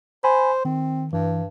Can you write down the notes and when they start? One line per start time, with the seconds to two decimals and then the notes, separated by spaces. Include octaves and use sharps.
0.24 C5 G#5 B5
0.65 D#3 C4
1.13 G2 E3